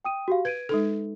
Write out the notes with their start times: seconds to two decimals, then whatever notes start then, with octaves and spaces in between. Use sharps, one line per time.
0.05 G5 D#6 D#7
0.28 F#4 G4 F5
0.45 B4 G#6 D7 D#7
0.69 G#3 D#4 A4